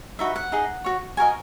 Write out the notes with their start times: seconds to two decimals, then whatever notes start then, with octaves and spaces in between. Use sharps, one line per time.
0.19 D#4 F#4 B4 E5
0.36 F#5
0.52 D#4 G#4 D#5
0.84 F#4 C#5
1.17 F#4 A#4 D#5 G#5